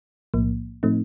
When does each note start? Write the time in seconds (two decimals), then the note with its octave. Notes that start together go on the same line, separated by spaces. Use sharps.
0.34 B1 A2 F3 A#3
0.83 A2 F3 A3 C4 D#4